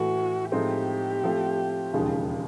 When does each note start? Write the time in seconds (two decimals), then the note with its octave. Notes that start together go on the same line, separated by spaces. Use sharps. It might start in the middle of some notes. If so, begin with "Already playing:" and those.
Already playing: A2 E3 A3 F#4
0.52 A2 F3 G#3 C4 D#4 G4
1.23 A2 F3 A3 C4
1.93 E1 D#2 C#3 F3 G#3